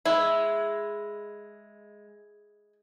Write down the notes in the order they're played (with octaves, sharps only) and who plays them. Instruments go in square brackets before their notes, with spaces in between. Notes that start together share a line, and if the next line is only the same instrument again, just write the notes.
[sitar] G#3 [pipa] E4